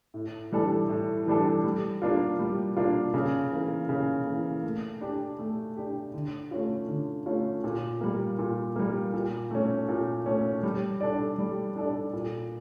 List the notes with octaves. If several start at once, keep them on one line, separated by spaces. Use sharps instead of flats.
A2
E3 G3 D4 A4
A2
E3 G3 D4 A4
G3
A#3 D4 F4
G3
A#3 D4 F4
C#3
E3 A#3
C#3
E3 A#3
A3
D4 G4
A3
D4 G4
D3
A3 C#4 F4
D3
A3 C#4 F4
A#2
G3 A#3
A#2
G3 A#3
A#2
A3 C#4
A#2
A3 C#4
G3
D4 A4 D5
G3
D4 A4 D5
A#2